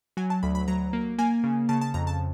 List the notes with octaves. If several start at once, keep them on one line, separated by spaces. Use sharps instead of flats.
F#3 G#5
A5
D2 B5
B5
F#3 A#5
A#3
A#3 G#5
C#3
C#3 A5
A5
F2 A#5
A5